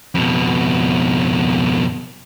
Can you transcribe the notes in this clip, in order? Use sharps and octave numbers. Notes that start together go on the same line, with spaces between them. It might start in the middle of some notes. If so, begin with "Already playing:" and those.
F2 B2